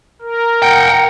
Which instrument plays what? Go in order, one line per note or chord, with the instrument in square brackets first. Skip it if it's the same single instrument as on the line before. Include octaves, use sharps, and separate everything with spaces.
[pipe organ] A#4
[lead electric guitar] F#5 G5